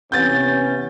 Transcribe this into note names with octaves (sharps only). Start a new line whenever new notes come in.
C3 E3 B3 C#4 G6 A6